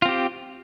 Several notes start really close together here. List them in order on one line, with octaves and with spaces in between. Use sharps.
F4 C4 G4